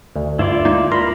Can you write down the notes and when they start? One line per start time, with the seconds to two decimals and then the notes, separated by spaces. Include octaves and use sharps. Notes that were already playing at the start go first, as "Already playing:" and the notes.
0.16 D2
0.39 G2 E4 F4 D5
0.65 G#3 A#3 D#4
0.92 A#4 B5 C6